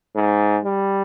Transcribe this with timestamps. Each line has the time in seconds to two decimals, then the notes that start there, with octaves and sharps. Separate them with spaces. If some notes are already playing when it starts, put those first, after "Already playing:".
0.15 G#2
0.64 G3